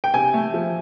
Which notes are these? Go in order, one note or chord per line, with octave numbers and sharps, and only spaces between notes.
G5
C3 G#5
A3
F3